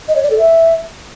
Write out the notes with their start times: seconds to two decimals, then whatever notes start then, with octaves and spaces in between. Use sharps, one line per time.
0.08 D#5
0.16 C#5
0.23 D5
0.31 A4
0.38 E5